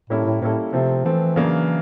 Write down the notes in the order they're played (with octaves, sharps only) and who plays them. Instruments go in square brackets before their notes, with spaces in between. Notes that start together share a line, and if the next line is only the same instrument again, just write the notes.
[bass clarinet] A2 [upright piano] G3 A#3 C#4 E4 A4
[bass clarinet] A2
[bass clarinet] A2 [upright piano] G3 A#3 C#4 E4 A4
[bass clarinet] C3 [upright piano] F3 A3 C4
[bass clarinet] E3 [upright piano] F3 A3 C4
[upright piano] C#3 F#3 A#3 D4